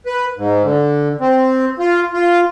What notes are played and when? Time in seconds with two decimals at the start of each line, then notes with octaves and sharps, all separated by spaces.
0.06 B4
0.37 G#2
0.64 D3
1.21 C4
1.79 F4
2.14 F4